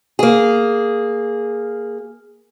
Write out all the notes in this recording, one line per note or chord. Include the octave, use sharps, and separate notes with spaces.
A#3 G#4